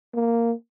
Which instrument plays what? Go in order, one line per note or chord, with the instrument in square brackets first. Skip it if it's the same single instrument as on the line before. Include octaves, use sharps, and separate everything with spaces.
[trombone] A#3